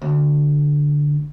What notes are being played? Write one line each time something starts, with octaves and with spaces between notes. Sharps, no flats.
D2